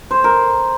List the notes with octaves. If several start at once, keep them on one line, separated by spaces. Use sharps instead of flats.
C5
A#4